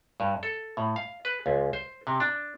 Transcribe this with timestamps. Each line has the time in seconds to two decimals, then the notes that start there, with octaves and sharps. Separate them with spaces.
0.20 G2
0.43 A4
0.77 A2
0.96 F5
1.25 B4
1.46 C#2
1.73 C5
2.07 C3
2.20 D4